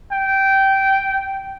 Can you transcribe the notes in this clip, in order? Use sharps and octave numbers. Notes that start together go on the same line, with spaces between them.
G5